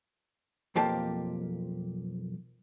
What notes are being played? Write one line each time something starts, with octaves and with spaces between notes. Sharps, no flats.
B1 F2 F3 A#3 G4 A5